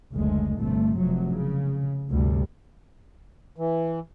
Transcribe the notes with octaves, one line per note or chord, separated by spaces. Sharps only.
F#1 D2 G#3
G1 C3 A3
F1 F#3
C#3
D2 G2 C3 G3
E3